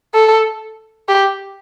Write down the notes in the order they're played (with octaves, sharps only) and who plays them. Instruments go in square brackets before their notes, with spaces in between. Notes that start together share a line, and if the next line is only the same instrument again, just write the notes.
[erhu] A4
G4